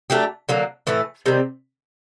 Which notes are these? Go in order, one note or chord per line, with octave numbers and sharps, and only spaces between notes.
F#3 A3 D4 G4
D3 F#3 A#3
A2 E3 A3
C3 D#3 G3 C4